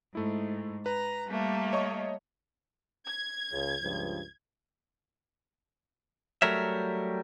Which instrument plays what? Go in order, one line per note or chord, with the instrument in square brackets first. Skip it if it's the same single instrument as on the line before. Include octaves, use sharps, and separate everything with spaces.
[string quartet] G#2 [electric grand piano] A3 E4
[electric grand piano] B4 [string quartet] A#5
[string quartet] G3 A3 A#3
[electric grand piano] C#5 D#5 C#6
[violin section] G#6
[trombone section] C#2 C#3
C#2 G2 F3
[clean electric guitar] F#3 G3 A3 A#4 C#5 E5